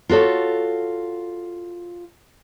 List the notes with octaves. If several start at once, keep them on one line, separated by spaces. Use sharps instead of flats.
F4 F#4 A4 C#5